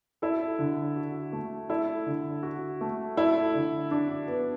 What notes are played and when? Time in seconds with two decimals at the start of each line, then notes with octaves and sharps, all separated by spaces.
0.22 E4 A4
0.59 D3
0.96 F#4
1.33 A3
1.69 E4 A4
2.06 D3
2.43 F#4
2.81 A3
3.17 E4 A4
3.54 D3
3.91 D4 F#4
4.28 B3